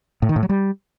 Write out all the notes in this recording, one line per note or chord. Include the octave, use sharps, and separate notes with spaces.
A2
D#3
A2
F#3
G3